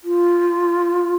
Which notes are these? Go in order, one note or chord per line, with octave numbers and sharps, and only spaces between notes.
F4